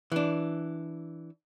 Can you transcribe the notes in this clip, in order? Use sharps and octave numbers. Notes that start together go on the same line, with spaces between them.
E3 D4